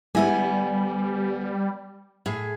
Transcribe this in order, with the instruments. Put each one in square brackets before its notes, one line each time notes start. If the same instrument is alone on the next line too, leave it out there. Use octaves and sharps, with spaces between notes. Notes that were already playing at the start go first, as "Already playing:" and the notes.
[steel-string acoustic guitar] D2 B3 G#5 [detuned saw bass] G3 [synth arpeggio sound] G#3 E4 E5
[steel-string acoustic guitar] A2 G#4